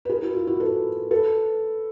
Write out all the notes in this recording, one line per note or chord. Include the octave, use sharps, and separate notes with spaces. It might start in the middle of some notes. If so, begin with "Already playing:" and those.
B4
G#4 A#4
E4 F#4
F4
E4 F#4
A4 B4
A4 B4